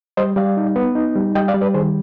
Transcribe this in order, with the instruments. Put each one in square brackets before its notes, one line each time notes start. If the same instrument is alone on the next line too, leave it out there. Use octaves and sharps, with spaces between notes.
[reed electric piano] G3 C5 D#5
G3 D5 F5
D#4
B3
D#4
G3
G3 D#5 G5
D5 F5
G3
B4 D5
D#3 G#4 C5